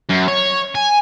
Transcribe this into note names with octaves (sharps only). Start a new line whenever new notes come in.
F#2
C#5
G#5